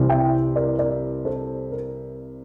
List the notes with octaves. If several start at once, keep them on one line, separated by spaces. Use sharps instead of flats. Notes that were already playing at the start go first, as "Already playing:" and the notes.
Already playing: C2 C3 E3 G3
E5 G5
A#4 D5
A#4 D5
A4 C5
A#4